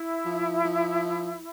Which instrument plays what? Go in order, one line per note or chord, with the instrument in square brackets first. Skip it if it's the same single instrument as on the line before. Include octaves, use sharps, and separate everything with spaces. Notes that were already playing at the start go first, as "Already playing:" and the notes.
Already playing: [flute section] E4
[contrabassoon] F3
F3